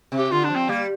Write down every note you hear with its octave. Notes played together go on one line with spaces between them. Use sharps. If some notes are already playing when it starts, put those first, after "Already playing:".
C3
G4
D3 F4
D4
F3
C4
G3 A#3